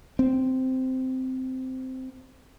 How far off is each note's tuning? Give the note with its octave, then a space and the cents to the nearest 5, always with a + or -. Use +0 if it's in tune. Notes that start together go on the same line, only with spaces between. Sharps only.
C4 -10